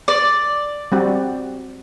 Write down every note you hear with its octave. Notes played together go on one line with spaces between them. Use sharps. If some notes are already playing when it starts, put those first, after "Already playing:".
D5
G3 C4 F#4